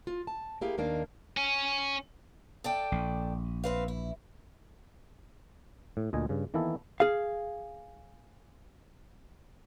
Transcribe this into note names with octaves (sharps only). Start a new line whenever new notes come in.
F4
A5
A#3 E4 G4 G#4 F5
D#2 D#3 A#3 D4 F5
C#4
A4 D5 G5
A#1
C4 B4 F5
E4
A2
D2 A#2 D#5 G#5
G2 C#3
D#3 E3 A#3 B3 E4 A4
G#4 F5